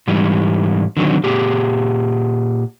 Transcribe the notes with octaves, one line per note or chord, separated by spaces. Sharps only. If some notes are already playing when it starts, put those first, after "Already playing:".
G#2 E3 G3
D3 D#3 F#3 C4
A#2 G4 G#4